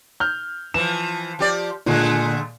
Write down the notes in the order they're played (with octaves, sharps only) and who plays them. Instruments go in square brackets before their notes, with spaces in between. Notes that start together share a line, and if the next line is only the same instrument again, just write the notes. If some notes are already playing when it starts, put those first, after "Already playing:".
[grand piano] F6 G6
[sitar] E3 F3 [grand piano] E7
[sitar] F3 G4 D5
[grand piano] A#2 [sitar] D3 G#3 A3